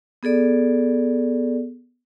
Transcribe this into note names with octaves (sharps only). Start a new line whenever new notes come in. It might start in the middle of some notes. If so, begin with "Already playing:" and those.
B3 G#4 A4 D5